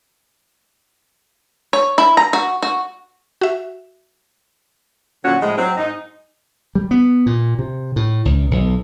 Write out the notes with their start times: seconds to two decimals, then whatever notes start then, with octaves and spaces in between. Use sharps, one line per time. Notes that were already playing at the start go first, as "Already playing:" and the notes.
1.73 C#5
1.98 E4
2.17 A#5
2.33 F#4
2.63 F#4
3.41 F#4 E5
5.25 A#2 D3 F#3 C#4 F#4
5.41 A2 F3 G#3
5.58 F#3 C4
5.77 G#2 D#4
6.75 G3
6.91 B3
7.26 A#2
7.59 C3
7.96 A2
8.25 C#2
8.51 B1